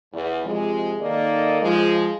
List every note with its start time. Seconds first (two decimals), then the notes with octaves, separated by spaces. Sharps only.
0.13 E2
0.44 C3 F3 G#3
1.01 D#3 A#3 D#4 A4 D5 D#5
1.62 F3 G#3